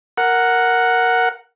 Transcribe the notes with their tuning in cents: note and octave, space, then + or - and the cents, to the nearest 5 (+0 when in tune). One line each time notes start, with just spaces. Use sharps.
A#4 +0 F#5 +0